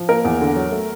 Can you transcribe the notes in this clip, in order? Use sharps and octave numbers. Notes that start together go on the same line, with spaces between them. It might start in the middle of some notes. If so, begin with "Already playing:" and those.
Already playing: F3
A#3 A#4
E2
D3
F#3
A3